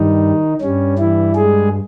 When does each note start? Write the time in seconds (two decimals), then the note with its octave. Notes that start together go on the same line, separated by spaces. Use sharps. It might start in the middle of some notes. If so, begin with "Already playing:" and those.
Already playing: G2 D#3 G3 D#4
0.61 G2 G3 C#4
0.98 E3 E4
1.36 G#3 G#4